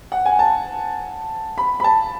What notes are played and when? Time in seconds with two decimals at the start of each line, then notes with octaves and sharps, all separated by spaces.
0.12 F#5
0.26 G#5
0.39 A5
1.58 B5
1.80 B5
1.84 A5